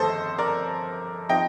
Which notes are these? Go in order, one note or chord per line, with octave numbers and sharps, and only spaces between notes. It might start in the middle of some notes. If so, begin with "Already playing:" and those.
Already playing: G1 F2 D#3 A3 A4 C5 D#5
A#4 D5
F3 C4 D#4 D#5 G5